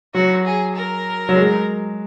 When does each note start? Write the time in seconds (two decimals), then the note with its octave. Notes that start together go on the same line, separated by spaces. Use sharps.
0.14 F#3 F#4
0.45 G#4
0.76 A#4
1.29 F#3
1.36 G#3